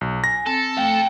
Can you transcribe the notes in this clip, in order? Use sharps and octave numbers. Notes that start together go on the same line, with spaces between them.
B1
G#5 A#6
C4 A4
A3 F5 G5